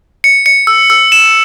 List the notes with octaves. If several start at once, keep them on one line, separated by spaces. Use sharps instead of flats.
C#7
C#7
E6
E6
E7